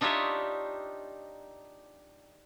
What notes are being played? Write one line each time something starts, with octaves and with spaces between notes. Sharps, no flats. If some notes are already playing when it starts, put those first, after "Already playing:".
D4 D#4 F4 G4 C#5 E5